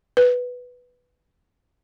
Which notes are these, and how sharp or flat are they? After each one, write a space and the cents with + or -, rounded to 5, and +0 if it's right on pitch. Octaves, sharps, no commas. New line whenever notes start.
B4 +0